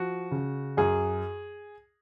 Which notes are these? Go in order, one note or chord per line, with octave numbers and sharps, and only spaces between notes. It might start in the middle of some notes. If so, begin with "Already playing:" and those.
Already playing: F3 F#4
C#3
F#2 G#4